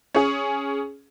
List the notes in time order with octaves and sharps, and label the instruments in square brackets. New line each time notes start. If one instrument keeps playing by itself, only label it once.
[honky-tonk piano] C#4 G#4